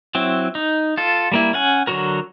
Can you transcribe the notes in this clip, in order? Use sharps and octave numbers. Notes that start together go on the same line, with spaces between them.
F#3 C4 E4
D#4
F4 A4
G3 A#3 E4
C#4 F#5 G#5
D3 F#3 F#4 A#4